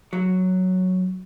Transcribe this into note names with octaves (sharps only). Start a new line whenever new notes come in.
F#3